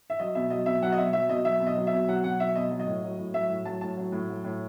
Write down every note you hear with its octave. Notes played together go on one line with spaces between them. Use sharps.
E5
F#3 D#5
B2 E5
F#3 D#5
B2 E5
F#3 F#5
D#5
B2 E5
F#3 E5
B2 D#5
F#3 E5
B2
D#5
F#3
E5
B2
F#3 F#5
B2 F#5
F#3 E5
B2 D#5
F#3
D#5
A2
F#3
A2
F#3 E5
A2
F#3 A5
A2 A5
F#3
A2
F#3
A2